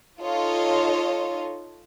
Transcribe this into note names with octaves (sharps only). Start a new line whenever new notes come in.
D#4 F4 A4 C#5 D#5